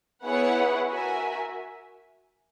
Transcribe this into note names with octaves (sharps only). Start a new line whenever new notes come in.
B3 E4 G#4 C#5 F#5
F#4 A#4 E5 G#5